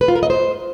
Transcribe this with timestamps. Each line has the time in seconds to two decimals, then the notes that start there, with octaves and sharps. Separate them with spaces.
0.01 B4
0.08 F4
0.15 A#4
0.23 D#5
0.30 C5